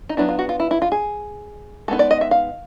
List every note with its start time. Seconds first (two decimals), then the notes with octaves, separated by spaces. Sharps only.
0.09 D#4
0.17 F#3 B3 D4 E4
0.29 F4
0.39 F#4
0.49 F4
0.60 E4
0.71 E4
0.82 F4
0.92 G#4
1.88 G#3 B3 D#4 A4
1.99 D5
2.11 D#5
2.21 E5
2.31 F5